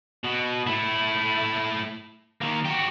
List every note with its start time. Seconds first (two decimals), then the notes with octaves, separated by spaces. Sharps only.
0.24 B2
0.67 A3 E4
2.41 D#3 A#3
2.65 F#4 G4